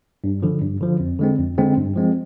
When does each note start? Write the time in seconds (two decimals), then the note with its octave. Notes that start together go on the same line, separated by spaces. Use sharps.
0.24 G2
0.42 D3 F3
0.61 G2
0.81 D3 F3
1.00 F2
1.19 D3 G#3 C4
1.39 F2
1.58 D3 G#3 C4
1.77 G2
1.96 F3 G#3 C4